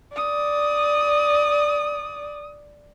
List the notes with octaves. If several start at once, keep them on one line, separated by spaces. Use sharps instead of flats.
D5 D#6